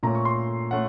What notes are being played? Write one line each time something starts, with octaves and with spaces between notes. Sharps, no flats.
A#2 A3 C#4 A#5
C#6
C6
A3 C#4 F#5